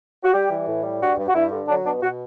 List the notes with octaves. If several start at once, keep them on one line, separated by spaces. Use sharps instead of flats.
F#4
G3 G4
E3
A2
G3
G2 F#4
G2
F#4
G2 E4
D3
F#3 D4
B2 D4
B2 F#4